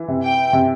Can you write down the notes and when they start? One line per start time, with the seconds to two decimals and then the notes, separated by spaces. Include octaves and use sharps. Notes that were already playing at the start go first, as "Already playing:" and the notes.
Already playing: E3
0.08 C3
0.23 G5
0.53 C3